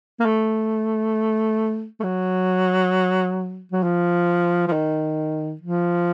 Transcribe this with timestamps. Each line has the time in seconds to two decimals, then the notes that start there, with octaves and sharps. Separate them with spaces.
0.20 A#3
0.25 A3
2.00 A3
2.04 F#3
3.72 F#3
3.83 F3
4.68 F3
4.72 D#3
5.62 F3